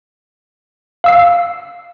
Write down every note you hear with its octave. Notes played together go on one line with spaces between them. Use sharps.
F5 E6 C7